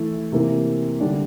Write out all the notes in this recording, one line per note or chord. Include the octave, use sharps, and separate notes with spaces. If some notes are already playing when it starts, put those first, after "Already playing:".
Already playing: E3 A3 E4
C3 E3 A#3
D3 G3 D4